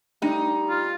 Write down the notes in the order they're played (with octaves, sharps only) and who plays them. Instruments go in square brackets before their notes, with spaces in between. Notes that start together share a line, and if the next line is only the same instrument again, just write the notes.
[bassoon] G3 [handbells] A3 D4 A#6 [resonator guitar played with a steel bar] D#4
[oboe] F4